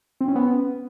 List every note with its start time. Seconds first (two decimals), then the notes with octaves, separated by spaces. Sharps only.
0.21 C4
0.28 C#4
0.35 B3